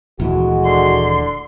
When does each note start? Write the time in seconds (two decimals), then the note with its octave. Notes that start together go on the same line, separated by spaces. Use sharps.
0.20 D#1 D2 E3 G#3 F#4
0.64 D3 C6